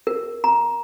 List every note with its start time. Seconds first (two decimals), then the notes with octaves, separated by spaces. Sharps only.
0.07 A#4
0.44 A#5